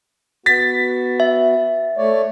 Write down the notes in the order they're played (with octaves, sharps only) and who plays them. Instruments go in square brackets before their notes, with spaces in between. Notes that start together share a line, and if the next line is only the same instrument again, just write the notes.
[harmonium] B3 F#4 [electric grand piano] A6 B6
[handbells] E5
[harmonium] A3 C#5 D5